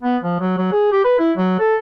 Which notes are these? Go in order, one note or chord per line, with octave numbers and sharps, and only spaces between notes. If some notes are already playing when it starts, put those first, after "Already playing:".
B3
F3
F#3
F#3
G#4
G4
B4
E4
F#3
A4